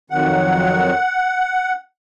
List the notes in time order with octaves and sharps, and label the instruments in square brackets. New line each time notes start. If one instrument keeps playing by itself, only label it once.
[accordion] F2 D#3 F#3 F#5